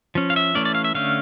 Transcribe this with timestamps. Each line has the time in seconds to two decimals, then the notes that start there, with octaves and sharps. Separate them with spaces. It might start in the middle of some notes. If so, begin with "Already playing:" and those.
0.15 F3 C#4
0.30 F5
0.36 E5
0.55 E3 A3 C#4 D5
0.65 D5
0.75 F5
0.84 E5
0.95 D3 A3 C#4 F5